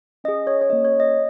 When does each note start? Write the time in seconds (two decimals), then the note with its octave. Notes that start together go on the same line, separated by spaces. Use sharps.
0.24 C#4 D#5
0.28 G#4
0.47 C#5
0.61 C#5
0.69 A#3 C#4 G#4 D#5
0.85 C#5
1.00 D#5